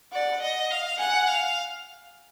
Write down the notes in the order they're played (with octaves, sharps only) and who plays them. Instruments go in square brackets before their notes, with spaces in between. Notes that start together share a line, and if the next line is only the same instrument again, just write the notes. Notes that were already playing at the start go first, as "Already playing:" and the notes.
[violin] D5 [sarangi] F#5
[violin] D#5
F5
[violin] F#5 [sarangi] G#5
[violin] F5